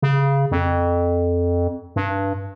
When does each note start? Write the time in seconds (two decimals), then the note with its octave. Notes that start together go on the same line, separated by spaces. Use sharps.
0.02 C#3
0.51 F2
1.96 G2